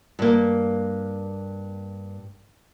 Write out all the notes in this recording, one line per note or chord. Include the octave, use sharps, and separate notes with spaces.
G2 A#3